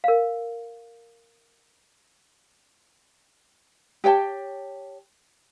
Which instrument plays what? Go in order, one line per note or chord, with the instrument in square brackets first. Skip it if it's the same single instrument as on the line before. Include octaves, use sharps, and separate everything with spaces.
[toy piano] A#4 F5
[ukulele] G4 C#5 G5 A5